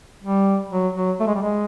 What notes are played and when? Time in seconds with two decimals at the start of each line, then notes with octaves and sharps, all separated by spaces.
0.23 G3
0.71 F#3
0.95 F#3
1.20 A3
1.27 G#3
1.35 G3
1.42 G#3